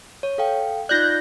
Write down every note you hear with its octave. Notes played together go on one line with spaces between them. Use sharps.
C#5
A4 F5 G5
D#4 F4 D5 F#6 G6 A#6